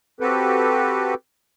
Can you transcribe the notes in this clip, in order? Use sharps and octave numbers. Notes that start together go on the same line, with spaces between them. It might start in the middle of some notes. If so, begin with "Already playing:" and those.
C4 F#4 G4 A4 B4